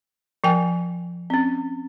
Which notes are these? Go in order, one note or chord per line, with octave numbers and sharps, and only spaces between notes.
F3 A#4 G5 G#5
C4 C#4